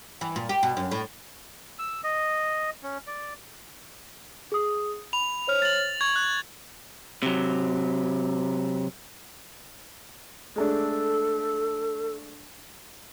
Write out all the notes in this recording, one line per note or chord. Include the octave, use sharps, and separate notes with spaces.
E3
A#2
G4
B2
F#2
A2
E6
D#5
C#4
D5
G#4 D#6
B5 F7
C5 C#5 F6
A6 F#7
C#6 G#6
F#6
C3 F#3
G#3 A3 D4 A4